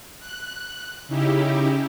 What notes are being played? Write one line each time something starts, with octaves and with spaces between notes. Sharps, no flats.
F#6
C#3 D#4 E4 G4